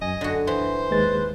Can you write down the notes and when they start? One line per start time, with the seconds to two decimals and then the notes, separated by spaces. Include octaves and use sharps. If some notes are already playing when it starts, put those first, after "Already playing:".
0.02 F#2 D#5 G#5
0.21 D3 F#4
0.47 E3 C5
0.91 D#2 G#3 B4 A6